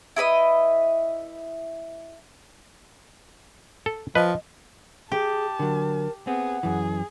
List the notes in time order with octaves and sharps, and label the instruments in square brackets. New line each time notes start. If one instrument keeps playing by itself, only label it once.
[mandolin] E4 A4 B4 D#5
[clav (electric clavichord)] A4
[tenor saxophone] F3 [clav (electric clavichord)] B4 [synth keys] D#5
[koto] G4 [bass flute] G#4 [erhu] A5
[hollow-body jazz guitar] D3 F#3 [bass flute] A#4
[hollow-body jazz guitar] B3 C4 [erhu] G#4 [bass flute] F#5
[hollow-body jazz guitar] F#2 E3 [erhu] G#4